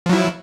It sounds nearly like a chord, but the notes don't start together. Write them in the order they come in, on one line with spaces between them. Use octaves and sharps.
F3 F#3 E4